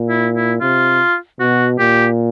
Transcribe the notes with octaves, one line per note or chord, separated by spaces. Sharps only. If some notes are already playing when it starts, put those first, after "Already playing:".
Already playing: A#2
E4
E4
C3 F4
B2 F#4
A#2 G4